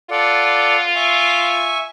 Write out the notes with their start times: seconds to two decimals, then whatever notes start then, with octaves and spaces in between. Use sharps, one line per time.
0.11 F4 A4 D5 F#5
0.95 E5 G#5 C#6